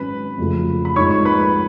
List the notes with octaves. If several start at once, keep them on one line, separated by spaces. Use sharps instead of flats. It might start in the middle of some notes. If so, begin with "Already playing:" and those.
Already playing: G#1 G#2 F#3 C#4 B4 B5
F1 F2 C#3 F#3
B5
A#1 G#2 D#3 G#3 D#4 C#5 C#6
B4 B5